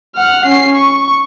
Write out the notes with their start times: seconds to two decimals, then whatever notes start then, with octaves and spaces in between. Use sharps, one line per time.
0.16 F#5 F6
0.46 C#4 C7
0.75 C#6